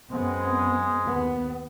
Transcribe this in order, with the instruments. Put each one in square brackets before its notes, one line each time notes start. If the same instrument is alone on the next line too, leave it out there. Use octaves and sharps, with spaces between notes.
[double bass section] F#2 B3 C4 [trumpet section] G#3
[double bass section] D#2 B3